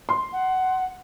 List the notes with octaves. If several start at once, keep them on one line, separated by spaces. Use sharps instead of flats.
C6
F#5